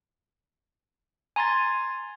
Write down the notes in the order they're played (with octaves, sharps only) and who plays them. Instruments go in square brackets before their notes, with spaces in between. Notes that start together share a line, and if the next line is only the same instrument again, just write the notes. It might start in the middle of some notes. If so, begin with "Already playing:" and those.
[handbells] G#5 A#5 C6 G#6 A6